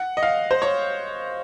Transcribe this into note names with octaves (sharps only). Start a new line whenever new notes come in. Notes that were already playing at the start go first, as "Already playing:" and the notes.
Already playing: F#5
D#5
F5
C5
C#5